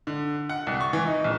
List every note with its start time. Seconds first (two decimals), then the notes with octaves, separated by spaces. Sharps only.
0.07 D3
0.49 F#5
0.67 C2
0.81 C#6
0.93 E3
1.06 D#4
1.24 A#1